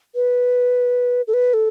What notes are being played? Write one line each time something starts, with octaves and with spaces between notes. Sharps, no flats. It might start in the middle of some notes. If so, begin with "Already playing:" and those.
B4
A4
B4
A4